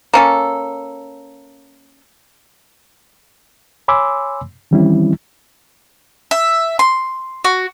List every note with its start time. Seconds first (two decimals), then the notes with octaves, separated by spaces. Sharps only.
0.13 A#3 C#4 A4
3.88 C#5 G#5 B5 C6 D6 E6
4.71 D#3 E3 G3 C4 C#4 E4
6.31 E5
6.79 C6
7.44 F#4